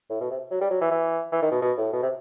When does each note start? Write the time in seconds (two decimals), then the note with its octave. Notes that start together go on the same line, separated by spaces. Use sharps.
0.10 A2
0.20 B2
0.30 C3
0.51 F#3
0.61 G3
0.70 F#3
0.81 E3
0.91 E3
1.32 E3
1.42 D#3
1.51 B2
1.62 B2
1.78 A2
1.93 B2
2.02 C3